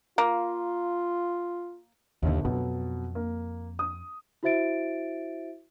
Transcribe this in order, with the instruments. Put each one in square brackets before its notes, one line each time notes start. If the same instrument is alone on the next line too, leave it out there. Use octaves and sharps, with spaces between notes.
[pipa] A#3 [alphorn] F4
[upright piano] G1 [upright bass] D#2 A#2
[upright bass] F2 [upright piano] B2 F#3
[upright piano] A#3
D#6
[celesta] E4 F#4 C5 E5 A6 D7